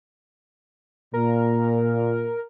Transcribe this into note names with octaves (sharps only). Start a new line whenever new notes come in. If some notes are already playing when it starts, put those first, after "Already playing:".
A#2 A#4